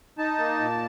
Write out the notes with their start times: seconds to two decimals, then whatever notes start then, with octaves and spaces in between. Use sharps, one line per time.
0.18 D#4 A5
0.39 A#3
0.60 A#2